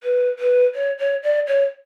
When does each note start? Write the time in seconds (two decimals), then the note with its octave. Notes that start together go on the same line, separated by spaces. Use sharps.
0.03 B4
0.39 B4
0.75 C#5
0.99 C#5
1.23 D5
1.47 C#5